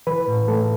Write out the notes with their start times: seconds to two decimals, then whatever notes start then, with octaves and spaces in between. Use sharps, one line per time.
0.07 E3 B4
0.28 A2
0.48 A3 A4